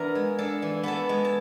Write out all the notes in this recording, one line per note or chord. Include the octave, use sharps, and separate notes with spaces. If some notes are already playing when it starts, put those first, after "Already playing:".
Already playing: E3 B3 D4 A#4 A#5
G#3
D4 A4 A5
E3
B3 A4 A5
G#3
A5